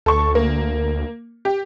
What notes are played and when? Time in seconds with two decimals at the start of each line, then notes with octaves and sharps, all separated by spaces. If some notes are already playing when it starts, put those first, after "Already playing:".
0.06 D2 A4 C#6
0.35 A#3
1.45 G4